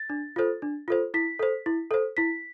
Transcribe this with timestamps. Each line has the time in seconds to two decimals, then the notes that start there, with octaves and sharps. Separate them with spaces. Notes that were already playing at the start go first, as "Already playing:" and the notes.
Already playing: A6
0.10 D4
0.36 F4 A4 C5
0.62 D4
0.88 F4 A4 C5
1.14 E4 B6
1.39 A4 C5
1.66 E4
1.91 A4 C5
2.17 E4 B6